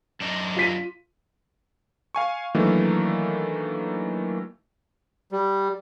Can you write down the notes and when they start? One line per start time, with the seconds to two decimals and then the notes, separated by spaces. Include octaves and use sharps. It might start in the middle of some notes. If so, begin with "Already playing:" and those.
0.20 F#2 D4 D#4
0.57 F4 B6 D#7
2.15 F5 G#5 C#6
2.54 D#3 E3 F#3 A3 A#3 D4
5.32 G3